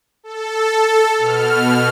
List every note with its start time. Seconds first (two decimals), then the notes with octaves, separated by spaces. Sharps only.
0.24 A4
1.18 B2 F6